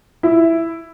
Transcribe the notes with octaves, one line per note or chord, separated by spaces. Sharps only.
E4